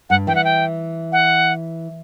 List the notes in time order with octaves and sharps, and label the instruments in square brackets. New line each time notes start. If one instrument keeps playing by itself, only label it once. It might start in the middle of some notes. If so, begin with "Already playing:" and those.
[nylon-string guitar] G2 [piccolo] F#5
[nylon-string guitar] E3 [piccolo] G5
[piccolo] F#5
G5
F#5